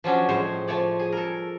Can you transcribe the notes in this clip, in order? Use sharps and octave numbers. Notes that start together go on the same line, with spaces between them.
F3 F#3 C#4 D4
A2 F3 G#3 C5 C#5
F3 A3 C#5 D5
G#4
A4 A#4